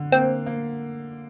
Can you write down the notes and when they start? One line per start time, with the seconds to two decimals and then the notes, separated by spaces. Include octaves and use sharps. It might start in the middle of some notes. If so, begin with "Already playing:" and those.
Already playing: D3
0.12 A#3 C4
0.46 A#3